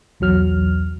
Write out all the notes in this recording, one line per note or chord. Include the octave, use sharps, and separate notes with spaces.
B1 E2 F#3 F6